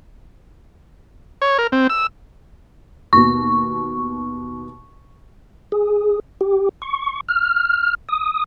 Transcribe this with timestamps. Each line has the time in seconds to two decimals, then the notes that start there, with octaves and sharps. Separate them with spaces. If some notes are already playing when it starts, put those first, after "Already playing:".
1.42 C#5
1.59 A#4
1.72 C4
1.90 E6
3.13 D#2 B2 C#6
5.72 G#4
6.41 G4
6.82 C#6
7.28 F6
8.09 D#6